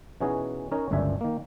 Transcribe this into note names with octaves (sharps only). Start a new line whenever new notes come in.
B2 E3 C#4 D#4 F#4 G#4
C#4 D#4 A#4 C#5
G1 C#2 F#2 D4 E5 G#5
D#3 A#3